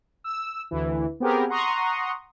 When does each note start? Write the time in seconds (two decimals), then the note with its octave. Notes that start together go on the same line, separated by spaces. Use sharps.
0.24 E6
0.71 D2 E3
1.20 B3 C4 G4 G#4 A#4
1.49 F#5 A#5 C6 C#6 D#6